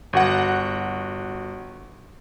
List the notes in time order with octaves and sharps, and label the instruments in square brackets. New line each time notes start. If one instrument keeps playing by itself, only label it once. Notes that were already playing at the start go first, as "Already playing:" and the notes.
[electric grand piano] G1 F#4 F#5